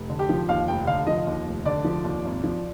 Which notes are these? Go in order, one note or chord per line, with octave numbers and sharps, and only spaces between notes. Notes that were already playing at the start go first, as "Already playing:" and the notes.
Already playing: F1
D3
G4
F3
D#2 F5
F1 G5
D3 F5
F3 D#5
D#2
F1
D3 D5
F3
D#2
G#1
F3